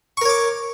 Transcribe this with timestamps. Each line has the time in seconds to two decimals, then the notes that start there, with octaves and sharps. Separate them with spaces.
0.17 C#6
0.21 A#4
0.25 C#5
0.29 D6